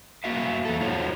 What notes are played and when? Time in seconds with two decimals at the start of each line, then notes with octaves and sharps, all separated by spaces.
0.24 A#3 F#4 E5 F5
0.65 E2 A4
0.81 D#4 F4 F#4 C5 C#5